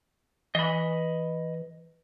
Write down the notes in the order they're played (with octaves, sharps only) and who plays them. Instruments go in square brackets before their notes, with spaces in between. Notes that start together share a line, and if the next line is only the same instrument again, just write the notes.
[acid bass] E3 [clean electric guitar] D#5 B5